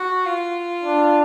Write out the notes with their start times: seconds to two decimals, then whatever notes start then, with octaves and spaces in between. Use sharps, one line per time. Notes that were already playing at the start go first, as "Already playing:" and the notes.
Already playing: F#4
0.25 F4
0.84 D4